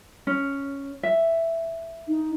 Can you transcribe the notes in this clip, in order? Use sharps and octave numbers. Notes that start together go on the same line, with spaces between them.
C#4
E5
D#4